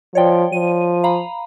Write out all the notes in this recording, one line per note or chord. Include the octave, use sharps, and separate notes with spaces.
F3 C#5 D5 G5
F3 D#7
F5 A#5 B5